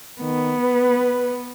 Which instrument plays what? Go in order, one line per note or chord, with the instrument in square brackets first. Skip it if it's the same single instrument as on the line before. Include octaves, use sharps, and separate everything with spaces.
[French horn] D#3 [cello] B3
[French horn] B4